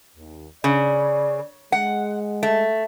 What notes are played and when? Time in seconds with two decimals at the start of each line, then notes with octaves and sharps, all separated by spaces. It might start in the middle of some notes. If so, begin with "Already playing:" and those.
0.16 D#2
0.64 C#3 D5
1.72 G#3 F#5
2.43 A3